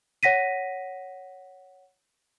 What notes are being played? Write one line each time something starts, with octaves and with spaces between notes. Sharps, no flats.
C#5 F#5 A#6 B6 D#7